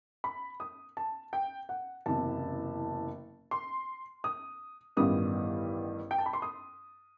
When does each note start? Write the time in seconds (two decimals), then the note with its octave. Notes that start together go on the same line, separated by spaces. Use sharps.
0.24 B5
0.60 D#6
0.97 A5
1.33 G5
1.69 F#5
2.06 F#1 E2 C3 A5
3.51 C6
4.24 D#6
4.97 A1 G2 D#3 G3 B3 D#6
6.11 G5
6.19 A5
6.26 B5
6.33 C6
6.42 D#6